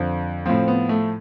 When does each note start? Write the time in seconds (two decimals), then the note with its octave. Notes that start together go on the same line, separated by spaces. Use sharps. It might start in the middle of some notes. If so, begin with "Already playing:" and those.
Already playing: F2 D3 F3 C4
0.46 A2 F3 C4
0.68 B3
0.89 A3